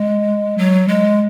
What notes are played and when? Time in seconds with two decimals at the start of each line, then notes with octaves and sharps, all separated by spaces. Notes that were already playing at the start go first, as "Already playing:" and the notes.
Already playing: G#3
0.58 F#3
0.88 G#3